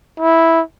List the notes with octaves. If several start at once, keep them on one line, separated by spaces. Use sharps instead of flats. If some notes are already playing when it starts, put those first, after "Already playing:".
E4